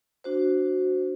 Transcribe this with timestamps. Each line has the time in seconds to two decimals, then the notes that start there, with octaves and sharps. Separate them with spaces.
0.24 D4 F#4 C5